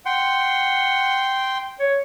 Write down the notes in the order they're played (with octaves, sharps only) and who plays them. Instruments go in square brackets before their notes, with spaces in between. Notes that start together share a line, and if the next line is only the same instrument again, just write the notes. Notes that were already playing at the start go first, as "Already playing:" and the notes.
[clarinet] F#5 [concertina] G5 C6
[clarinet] C#5